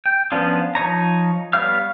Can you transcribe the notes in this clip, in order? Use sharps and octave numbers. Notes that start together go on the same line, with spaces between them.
G5
F3 B3 C#4 D4 F4
F3 D#4 C#5 A#5
G3 B3 C#5 F5 F6